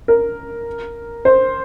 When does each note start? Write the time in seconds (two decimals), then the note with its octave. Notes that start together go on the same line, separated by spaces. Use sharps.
0.08 A#4
1.25 C5